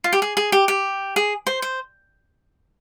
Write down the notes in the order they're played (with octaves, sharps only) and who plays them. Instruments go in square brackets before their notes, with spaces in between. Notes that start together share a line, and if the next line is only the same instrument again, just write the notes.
[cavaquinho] F4
G4
G#4
G#4
G4
G4
G#4
C5
C5